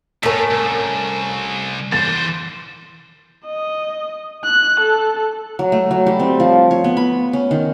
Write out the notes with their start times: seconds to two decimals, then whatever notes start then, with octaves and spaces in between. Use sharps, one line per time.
0.23 A2 A3 C#4 A#4 B6
0.51 C2
1.92 E3 C5 A6
3.45 D#5
4.44 F#6
4.80 A4
5.59 F#3
5.72 A3
5.91 F#3
6.06 G3
6.20 C4
6.40 F3
6.71 C#5
6.84 B3
6.97 B5
7.33 C#4
7.51 D#3